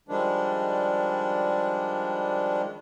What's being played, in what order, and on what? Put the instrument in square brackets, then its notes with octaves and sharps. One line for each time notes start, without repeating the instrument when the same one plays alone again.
[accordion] D#3 F3 G3 G#3 D4